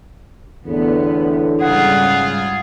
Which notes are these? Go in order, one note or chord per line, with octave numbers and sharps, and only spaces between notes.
E2 A2 D3 B3
G#2 C#3 G3 F4 G#4 F#5